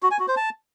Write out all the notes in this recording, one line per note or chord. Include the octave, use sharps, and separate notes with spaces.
F#4
G#5
F#4
C5
A5